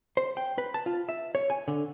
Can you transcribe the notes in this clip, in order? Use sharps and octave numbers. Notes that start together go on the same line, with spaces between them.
C5
G5
B4
A5
F4
E5
C#5
G#5
D3